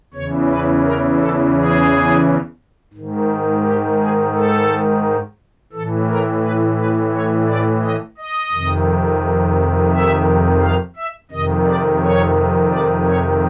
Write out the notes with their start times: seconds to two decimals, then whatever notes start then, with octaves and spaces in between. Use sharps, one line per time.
0.14 E2 C#3 E3 C#5
0.49 B4
0.84 A#4
1.19 A4
1.54 G#4
2.93 G#2 D#3
3.64 G4
3.99 G#4
4.33 A4
5.72 A2 E3 A4
6.08 A#4
6.42 B4
6.78 B4
7.13 C#5
7.47 D5
7.82 D#5
8.18 D#5
8.52 F2 C3 D#3
9.92 E5
10.61 F5
10.96 E5
11.31 F2 C3 D#3 D#5
11.66 D5
12.01 C#5
12.70 D5
13.06 C#5